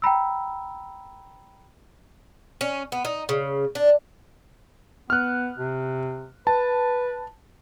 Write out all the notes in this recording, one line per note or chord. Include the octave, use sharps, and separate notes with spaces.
G5 A#5 B5 E6
C#4
B3
D#4
C#3
D4
B3 F6 F#6
C3
B4 A5